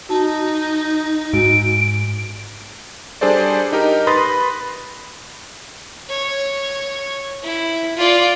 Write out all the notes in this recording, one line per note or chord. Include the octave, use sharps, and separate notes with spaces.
D#4 F#4 A5
G#2 F#4 D7
G3 D4 G#4 A4 C5 D5
D#4 G4 A#4
B4 B5 C6 D#6 A6 A#6
C#5
E4
F4 D5